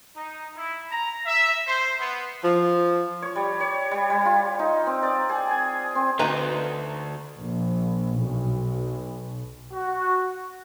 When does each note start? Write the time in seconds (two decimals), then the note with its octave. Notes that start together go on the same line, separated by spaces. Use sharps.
0.16 D#4
0.56 E4
0.91 A#5
1.26 E5
1.67 C5
2.00 B3
2.44 F3
3.22 C#5
3.35 G3
3.60 C#5
3.91 G3
4.10 G3
4.25 F4
4.59 D#4
4.87 C4
5.03 D5
5.29 G#4
5.51 G#5
5.95 C4
6.19 D2 D#4 B4 A#5
7.36 A#1
8.21 B1
9.72 F#4